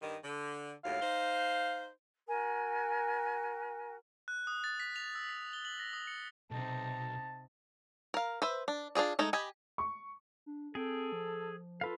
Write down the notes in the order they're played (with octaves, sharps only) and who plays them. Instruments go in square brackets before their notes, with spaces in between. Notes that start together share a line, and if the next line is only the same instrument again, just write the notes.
[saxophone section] G2 D#3
D3
[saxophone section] D#2 A2 F#3 [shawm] F5
[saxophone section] D#4 C5
[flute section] F#4 A#4 G#5
[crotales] F#6
D#6
A6
B6
F7
E6
B6
G7
F#7
A#6
D#6
C#7
[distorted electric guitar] B1 [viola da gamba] C3 D#4 [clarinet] A5
[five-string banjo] A#4 F5
B4 C5 E5
D4
D4 F4 G#4 D5
G#3 A3 D#4 A4
G4 D#5 G#5 B5
[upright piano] C#6
[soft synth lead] D4
[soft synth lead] C4 [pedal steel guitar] G#4 G5 [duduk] A4
[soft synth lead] F3
[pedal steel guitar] F4 B4 F5 [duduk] A4